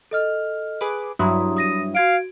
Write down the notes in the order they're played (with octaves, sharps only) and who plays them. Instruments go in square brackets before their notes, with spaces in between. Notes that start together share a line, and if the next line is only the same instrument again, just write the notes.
[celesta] A4 D#5 F6
[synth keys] G#4 B4 D6
[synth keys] G2 F#3 E4 [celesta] A#5 C6 D#6
[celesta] D#6 A#6 D#7
[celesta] F#4 G#6 D7 [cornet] F5